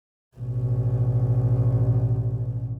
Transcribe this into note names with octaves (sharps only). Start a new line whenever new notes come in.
A1 B2